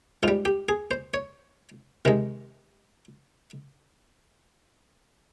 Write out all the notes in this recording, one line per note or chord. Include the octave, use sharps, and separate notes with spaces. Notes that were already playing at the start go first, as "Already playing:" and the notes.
G#2 G3 F4
G4
G#4
C5
C#5
C3 D#3 G#3